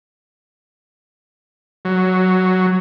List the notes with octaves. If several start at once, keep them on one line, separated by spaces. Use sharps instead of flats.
F#3